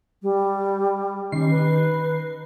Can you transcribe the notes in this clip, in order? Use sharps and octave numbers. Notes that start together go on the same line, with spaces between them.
G3
D#3 C#4 C7
B4